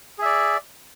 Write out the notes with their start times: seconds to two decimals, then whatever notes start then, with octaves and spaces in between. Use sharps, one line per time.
0.18 G#4
0.22 E5
0.26 D5